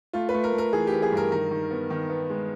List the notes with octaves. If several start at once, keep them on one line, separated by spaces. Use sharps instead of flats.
A3 F4
B4
A3
A#4
A3
A#4
E3 G#4
G4
E3
G#4
G2 A#4
D#3 A#4
D#3
B3
D#3
B3
G#3